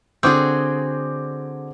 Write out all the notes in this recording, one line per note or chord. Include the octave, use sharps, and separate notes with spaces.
D3 C4 F#4 G#4 D6 G6